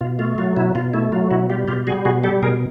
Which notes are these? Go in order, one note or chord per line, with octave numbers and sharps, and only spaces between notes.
B2 F4
A3 F4
F#3 F4
B2 E4
B2 F4
A3 E4
F#3 F4
B2 E4 F#4
G3 F4 G4
B2 F4 G4
G3 F#4 G#4
B2 F#4 G#4
G3 G4 A4
B2 G#4 A#4